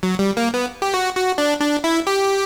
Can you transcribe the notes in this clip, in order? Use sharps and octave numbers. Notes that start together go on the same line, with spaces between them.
F#3
G3
A#3
B3
G4
F#4
F#4
D4
D4
E4
G4